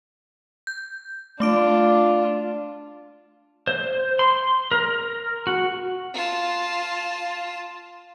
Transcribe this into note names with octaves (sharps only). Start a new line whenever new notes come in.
G6
A3 D4 F4 D6 D7
C5
C6
A#4
F#4
F4 A5